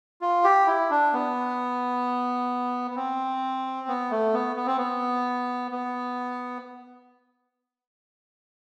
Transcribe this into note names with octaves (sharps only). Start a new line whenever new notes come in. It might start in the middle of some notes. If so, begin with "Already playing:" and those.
F4
G4
E4
D4
B3
B3
C4
B3
A3
B3
B3
C4
B3
B3